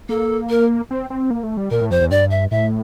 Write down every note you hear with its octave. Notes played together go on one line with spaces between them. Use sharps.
A#3 A4
A#4
C4
C4
A#3
A3
G3
A#2 A#4
A2
F2 C5
E2
G2 D5
E5
A2 E5